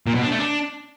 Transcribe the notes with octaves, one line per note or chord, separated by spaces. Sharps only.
A#2
B2
D4
A3
D4